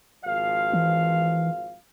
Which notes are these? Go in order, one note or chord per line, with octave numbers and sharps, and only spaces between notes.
G#1 F3 F5
E3